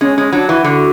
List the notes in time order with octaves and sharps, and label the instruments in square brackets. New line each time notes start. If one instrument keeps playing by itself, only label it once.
[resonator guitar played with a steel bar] G#3 [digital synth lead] C#4
[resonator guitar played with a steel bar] G#3 [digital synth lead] C#4
[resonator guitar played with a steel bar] F#3 [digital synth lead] D4
[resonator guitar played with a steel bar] E3 [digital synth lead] F#4
[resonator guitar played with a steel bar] D3